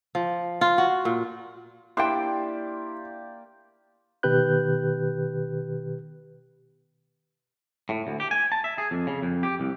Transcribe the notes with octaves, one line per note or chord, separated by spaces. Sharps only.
F3
F4
F#4
A#2
A#3 D4 E4 G4 C5 D5 G5 C6
B2 D#3 G4 B4 F#6 G6
A2
D2
G4
G#5
A5
E5
G#4
F2
C#3
F2
G4
C2